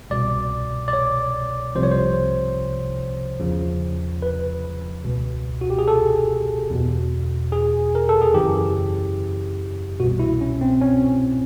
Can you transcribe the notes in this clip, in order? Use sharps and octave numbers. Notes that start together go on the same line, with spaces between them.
C2 B2 D5
D5
C#5
C2 C3 F3 C5
C#5
C5
E2 C#3 F3
B4
C#2 B2
F#4
G4
G#4
A4
E2 B2
G#4
A#4
A4
G#4
F#2 C#3 E3 G4
C2 B2 F#4
E4
C#4
C4
C#4